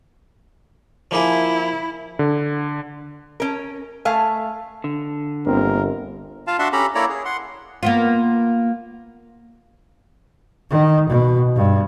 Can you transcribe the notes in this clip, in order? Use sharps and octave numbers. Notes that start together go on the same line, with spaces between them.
F3 A#3 E4 G#4
D3
C#4 A#4
A3 F5 G#5
D3
G1 A#3 C4 A#4
F4 F5 A5
D4 F#4 E5 F#5 A5 C6
C#4 G4 A4 A#5 B5
A#3 E4 A4 C#5 D5 A#5
G#4
F#5 C6
A#3 B3 F4
D#3
B2
G2